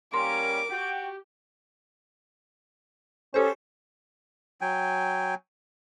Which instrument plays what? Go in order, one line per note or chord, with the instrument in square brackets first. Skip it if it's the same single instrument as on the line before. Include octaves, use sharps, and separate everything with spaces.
[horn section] G3 A#3 C#4 [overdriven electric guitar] A#4 [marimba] C6 [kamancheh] D6
[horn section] F#4 G5 [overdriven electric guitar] G4
[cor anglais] C#4 [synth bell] G4 A4 C5
[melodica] F#3 G5 G#5